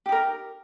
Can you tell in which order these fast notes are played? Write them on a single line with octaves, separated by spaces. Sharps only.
G4 D#4 A#4